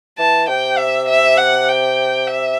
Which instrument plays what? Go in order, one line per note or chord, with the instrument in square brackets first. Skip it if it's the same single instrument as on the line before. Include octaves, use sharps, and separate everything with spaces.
[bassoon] E3 [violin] A5
[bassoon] C3 [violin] G5
[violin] E5
E5
F#5
G5
E5